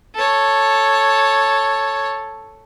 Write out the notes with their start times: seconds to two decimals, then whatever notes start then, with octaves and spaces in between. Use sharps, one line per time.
0.15 A4 C#5